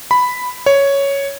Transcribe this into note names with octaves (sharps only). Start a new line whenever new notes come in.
B5
C#5